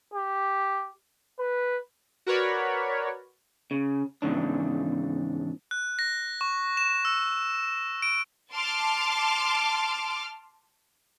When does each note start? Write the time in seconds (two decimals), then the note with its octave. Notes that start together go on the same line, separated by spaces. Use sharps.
0.14 G4
1.39 B4
2.26 F#4 A#4 B4 C#5 D5 B5
3.71 C#3
4.22 E2 G#2 C#3 D4
5.71 F#6
5.99 A#6
6.41 C#6
6.77 E7
7.05 E6
8.02 D7
8.53 A5 C6 D6 F6